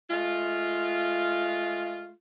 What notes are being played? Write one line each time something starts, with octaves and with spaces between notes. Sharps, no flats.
G#3 A3 F4